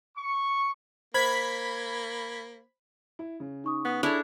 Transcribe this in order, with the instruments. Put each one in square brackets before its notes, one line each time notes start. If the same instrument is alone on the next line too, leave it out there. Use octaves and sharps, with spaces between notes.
[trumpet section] C#6
[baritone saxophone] A#3 [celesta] C5 [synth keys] B5 G#6 B6
[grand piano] E4
C#3
[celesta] D#4 C#6 D#6
[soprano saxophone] B3
[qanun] D4 C#5 [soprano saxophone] E4 [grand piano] G#4 A4 A5